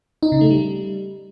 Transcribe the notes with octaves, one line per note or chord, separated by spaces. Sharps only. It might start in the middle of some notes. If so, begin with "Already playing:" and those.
D#4
C#3
A3
G3